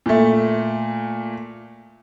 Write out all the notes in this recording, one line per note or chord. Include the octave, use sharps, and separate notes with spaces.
A#2 A3